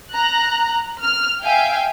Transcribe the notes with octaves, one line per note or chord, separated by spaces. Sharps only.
A#5 F#6
F6
E5 F5 G5 G#5